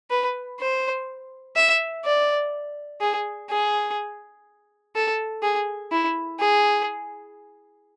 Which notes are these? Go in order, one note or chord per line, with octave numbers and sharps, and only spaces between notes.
B4
C5
E5
D5
G#4
G#4
A4
G#4
E4
G#4